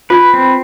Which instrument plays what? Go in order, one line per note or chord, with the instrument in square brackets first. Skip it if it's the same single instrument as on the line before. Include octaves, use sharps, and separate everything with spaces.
[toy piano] F4 [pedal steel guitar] B4
[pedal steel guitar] C4